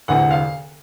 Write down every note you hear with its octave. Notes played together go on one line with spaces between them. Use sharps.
E1 D2 C3 E3 F#5
F5